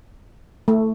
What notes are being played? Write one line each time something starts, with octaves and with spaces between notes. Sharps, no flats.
A3